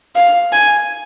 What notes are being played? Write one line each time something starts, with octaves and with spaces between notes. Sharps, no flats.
F5
G#5